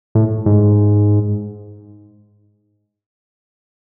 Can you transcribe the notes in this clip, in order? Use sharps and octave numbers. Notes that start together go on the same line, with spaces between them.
A2
G#2